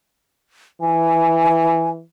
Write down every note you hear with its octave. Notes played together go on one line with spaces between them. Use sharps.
E3 G#5